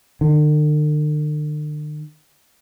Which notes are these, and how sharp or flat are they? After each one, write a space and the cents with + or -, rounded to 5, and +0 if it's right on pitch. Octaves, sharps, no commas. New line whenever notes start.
D3 +45